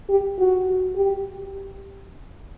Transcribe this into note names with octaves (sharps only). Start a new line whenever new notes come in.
G4
F#4
G4